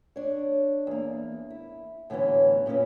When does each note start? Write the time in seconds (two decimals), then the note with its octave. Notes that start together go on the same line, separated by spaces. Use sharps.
0.16 D4 C#5
0.87 E2 A#3
1.50 E4
2.10 A2 D3 E3 F#3 B3 C#4
2.66 F#2 A#2 C#3 C#4 B4